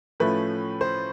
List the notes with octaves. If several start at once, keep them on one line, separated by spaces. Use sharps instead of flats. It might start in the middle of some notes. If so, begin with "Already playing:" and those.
A2 F3 A3 C#4 B4
C5